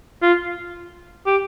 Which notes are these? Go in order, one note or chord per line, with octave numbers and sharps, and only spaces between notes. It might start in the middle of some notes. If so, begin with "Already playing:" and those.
F4
G4